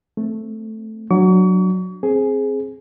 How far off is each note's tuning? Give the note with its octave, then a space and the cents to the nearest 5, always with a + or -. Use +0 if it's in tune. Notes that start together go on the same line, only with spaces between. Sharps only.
A3 +0 C4 +0
F#3 +0 D4 +20 C#6 +40
C4 +10 G#4 +10